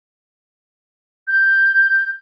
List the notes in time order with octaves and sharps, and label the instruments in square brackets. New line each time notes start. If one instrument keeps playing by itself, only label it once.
[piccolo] G6